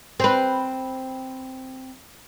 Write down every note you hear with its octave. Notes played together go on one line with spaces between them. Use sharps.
C4 B4